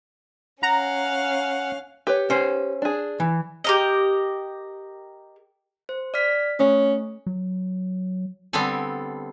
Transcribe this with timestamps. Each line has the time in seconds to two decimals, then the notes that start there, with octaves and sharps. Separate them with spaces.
0.63 C#4 F5 F#5 A#5
2.07 G4 B4 C#5
2.30 C#4 C5
2.82 D4 G#4
3.20 E3
3.64 G4 A#4 D#5
5.89 C5
6.14 D5 F6 B6
6.60 A3 C#4
7.26 F#3
8.53 D3 G3 B3 C4 A4 G#5